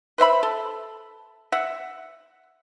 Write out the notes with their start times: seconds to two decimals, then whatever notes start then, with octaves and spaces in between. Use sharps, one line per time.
0.18 B4 C5 E5 B5
0.43 A4
1.52 E5 F#5